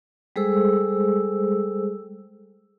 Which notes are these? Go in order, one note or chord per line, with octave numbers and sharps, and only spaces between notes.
G3 G#3 G#4 A4 C5 E6